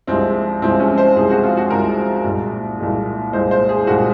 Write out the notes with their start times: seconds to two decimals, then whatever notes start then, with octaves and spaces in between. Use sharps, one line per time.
0.07 C2 C3 F3 G#3 C4
0.62 C2 C3 F3 G#3 C4
0.80 C#4
0.98 C5
1.16 C2 C3 F3 G#3 G#4
1.30 F#4
1.44 F4
1.57 F#4
1.70 C2 C3 F3 G#3 A#4
2.24 C2 A#2 G#3
2.79 C2 A#2 G#3
3.33 C2 A#2 G#3 C5
3.51 C5
3.69 G#4
3.87 C2 A#2 G#3 F#4